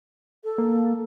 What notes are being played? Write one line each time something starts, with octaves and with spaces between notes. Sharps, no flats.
A4
A#3